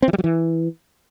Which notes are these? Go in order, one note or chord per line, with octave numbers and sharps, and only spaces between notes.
C4
E3
G3
F#3
E3